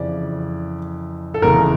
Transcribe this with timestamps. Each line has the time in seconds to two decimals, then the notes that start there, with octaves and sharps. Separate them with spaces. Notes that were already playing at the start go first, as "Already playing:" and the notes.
Already playing: F2 C#3 E3 D5
1.34 A4
1.42 F1 E2 C#3 A#4